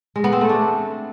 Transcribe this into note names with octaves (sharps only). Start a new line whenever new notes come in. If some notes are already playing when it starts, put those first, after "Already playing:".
G#3
B3
C4
A3
D4